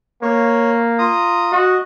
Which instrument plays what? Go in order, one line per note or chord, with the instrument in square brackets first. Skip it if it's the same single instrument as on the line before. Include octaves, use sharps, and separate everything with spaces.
[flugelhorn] A#3 [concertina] C#5
[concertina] F4 A#5 D#6
[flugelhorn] F#4 [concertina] D#5